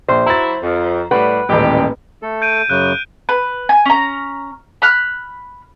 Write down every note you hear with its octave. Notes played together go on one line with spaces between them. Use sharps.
A#1 C5
F#3 E4 A#5 A6
F2
A2 G3 B4 F#5
D#1 A1 G#3 E4 G4
A3 A4
G6 D7 D#7
F#2 C#3 F#6
B4
G#5
C#4 A#5
B5 F6 F#6